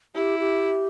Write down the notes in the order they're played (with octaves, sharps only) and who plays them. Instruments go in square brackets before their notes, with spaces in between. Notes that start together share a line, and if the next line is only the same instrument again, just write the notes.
[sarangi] E4 [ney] G4
[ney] G4